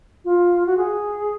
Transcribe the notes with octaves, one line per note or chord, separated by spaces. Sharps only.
F4
F#4
G#4